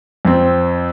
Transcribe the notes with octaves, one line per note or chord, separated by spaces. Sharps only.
F2 C4